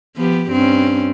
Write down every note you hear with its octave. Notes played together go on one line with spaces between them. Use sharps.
F3 B3 G4
G2 C4 C#4